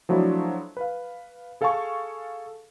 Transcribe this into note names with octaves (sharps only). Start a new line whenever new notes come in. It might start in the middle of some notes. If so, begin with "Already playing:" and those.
F3 F#3 A3 D4 E4
B4 F5
G#4 A4 F5 G#5 A5 C#6